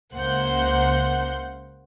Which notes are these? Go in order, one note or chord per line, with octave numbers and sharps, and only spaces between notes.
C#2 A#3 C5 F#5 G6